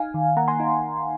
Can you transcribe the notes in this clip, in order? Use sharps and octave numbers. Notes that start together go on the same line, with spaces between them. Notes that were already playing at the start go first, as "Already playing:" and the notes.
Already playing: D#4 F5 G#5
D#3
A#3 F#5 A#5
G#5 C6
D#4